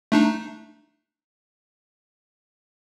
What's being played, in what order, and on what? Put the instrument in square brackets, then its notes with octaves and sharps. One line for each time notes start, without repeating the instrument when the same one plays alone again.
[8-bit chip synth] A3 D4 D#4